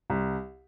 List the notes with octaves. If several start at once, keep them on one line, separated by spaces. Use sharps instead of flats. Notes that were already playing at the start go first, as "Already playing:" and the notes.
C2